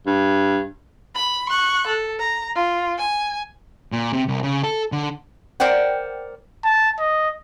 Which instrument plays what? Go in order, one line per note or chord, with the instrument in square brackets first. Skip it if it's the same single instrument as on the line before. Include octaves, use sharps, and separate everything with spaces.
[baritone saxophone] G2
[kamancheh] B5
C#6 F#6
A4
A#5
F4
G#5
[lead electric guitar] A#2
C3
C2
C#3
A4
D3
[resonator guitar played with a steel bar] A#4 C5 D5 F#5 G5
[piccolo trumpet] A5
D#5